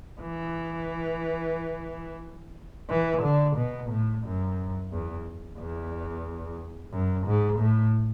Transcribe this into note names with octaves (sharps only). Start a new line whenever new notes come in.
E3
E3
D3
B2
A2
F#2
E2
E2
F#2
G#2
A2